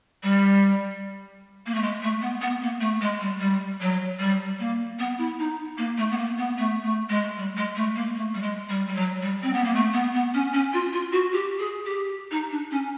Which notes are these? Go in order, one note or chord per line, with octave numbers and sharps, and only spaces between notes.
G3
A#3
A3
G#3
A3
B3
B3
A#3
A3
G#3
G3
G3
F#3
G3
A#3
B3
E4
D#4
A#3
A3
B3
A#3
B3
A3
A3
G#3
G3
G#3
A3
A#3
A3
G3
G#3
G3
G3
F#3
G3
C4
B3
A#3
A3
B3
B3
C#4
C#4
F4
F4
F#4
G4
G#4
G4
D#4
D4
C#4